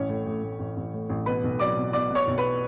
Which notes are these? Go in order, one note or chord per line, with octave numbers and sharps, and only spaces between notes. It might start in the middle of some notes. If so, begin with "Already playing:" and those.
Already playing: A1 C#4 C#5
A2
A2
A2
A1
A1
A2
A1
B2 B4 B5
B1
F#3 D5 D6
B2
B2 D5 D6
B2
C#5 C#6
B1
B4 B5